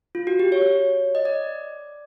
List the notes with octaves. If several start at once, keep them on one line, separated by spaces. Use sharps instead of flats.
F4
F#4
G4
C#5
D#5
D5